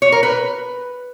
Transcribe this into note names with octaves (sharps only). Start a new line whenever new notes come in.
C#5
A#4
B4